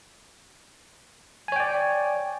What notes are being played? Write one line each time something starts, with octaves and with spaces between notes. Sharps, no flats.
C#5 D5 G5 G#5